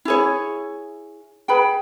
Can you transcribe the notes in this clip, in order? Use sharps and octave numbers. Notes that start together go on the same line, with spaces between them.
E4 G#4 C#5
G#4 B4 G5 B5